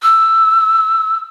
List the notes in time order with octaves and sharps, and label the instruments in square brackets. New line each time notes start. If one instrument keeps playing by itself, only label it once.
[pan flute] E6